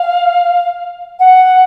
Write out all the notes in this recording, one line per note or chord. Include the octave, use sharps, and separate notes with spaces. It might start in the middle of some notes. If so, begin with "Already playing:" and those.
Already playing: F5
F#5